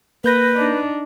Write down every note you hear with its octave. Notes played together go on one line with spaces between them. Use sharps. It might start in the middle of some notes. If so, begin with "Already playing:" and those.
A#3 B4 G6 A#6
D4 D#4